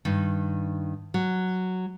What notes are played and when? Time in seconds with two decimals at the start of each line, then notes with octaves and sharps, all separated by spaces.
0.05 G2 D#3
1.14 F#3